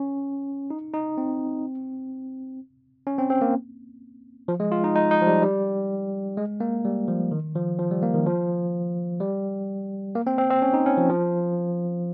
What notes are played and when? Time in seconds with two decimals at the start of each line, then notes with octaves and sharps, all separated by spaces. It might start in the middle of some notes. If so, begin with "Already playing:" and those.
Already playing: C#4
0.70 D#4
0.94 D#4
1.18 C4
3.07 C#4
3.18 C4
3.30 C4
3.42 A#3
4.48 F3
4.60 G#3
4.72 F4
4.84 D#4
4.95 D#4
5.11 D#4
5.22 F3
5.27 G3
5.42 G3
6.37 G#3
6.60 A#3
6.85 G3
7.08 F3
7.32 D#3
7.55 F3
7.79 F3
7.91 G3
8.02 A#3
8.14 D#3
8.27 F3
9.20 G3
10.15 A#3
10.27 C4
10.38 C4
10.50 C4
10.62 C#4
10.74 D#4
10.86 C#4
10.97 F3
11.09 F3